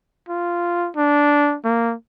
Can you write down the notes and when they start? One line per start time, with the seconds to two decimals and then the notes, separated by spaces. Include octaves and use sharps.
0.29 F4
0.96 D4
1.65 A#3